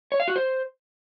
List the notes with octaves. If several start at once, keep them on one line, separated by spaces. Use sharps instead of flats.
C#5
F5
F#4
C5